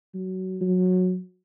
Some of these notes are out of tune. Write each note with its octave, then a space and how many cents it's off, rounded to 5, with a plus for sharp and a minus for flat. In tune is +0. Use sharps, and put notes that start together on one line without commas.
F#3 +15
F#3 -15